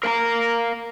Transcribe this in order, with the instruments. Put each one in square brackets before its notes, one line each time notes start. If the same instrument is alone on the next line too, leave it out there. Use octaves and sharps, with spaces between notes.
[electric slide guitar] A#4 F5 A5 A#5